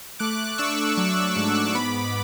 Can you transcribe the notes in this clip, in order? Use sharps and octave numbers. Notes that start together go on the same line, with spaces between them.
A3 D6 F#6
D4 C#6 E6
F#3
G#2
B3 B5 D6